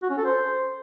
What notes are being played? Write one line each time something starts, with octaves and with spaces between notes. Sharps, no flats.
F#4
C#4
A4
C5